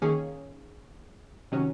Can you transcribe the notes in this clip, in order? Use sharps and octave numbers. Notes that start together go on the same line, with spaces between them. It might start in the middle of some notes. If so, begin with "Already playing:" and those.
D#3 A#3 C#4 G#4
C3 D#3 F#3 C#4